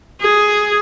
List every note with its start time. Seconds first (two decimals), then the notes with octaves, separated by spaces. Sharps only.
0.21 G#4